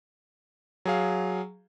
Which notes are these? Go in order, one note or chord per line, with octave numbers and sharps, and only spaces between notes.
F#3 G#4 F5